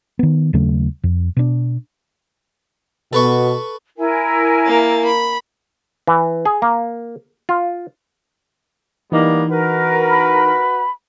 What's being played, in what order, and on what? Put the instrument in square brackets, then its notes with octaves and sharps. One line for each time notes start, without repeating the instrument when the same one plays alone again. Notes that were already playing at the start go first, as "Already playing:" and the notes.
[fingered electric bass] D#3 B3
D#2 C#3 F#3 A3
F2
B2 D4
[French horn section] B2 [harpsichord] A4 B4 C#6
[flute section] E4 A#4 G#5
[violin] A#3 A6
B5
[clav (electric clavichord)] E3
G#4
A#3
F4
[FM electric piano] E3 D#4 [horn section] G3 A#3 B3
[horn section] F#4 B4 [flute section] A#4
[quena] B5